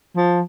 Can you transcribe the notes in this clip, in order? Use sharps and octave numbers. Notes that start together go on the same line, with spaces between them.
F3